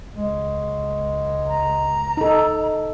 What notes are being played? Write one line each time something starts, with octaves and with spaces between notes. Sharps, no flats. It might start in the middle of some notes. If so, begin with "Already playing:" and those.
C#2 G#3
A#5
D#4 A4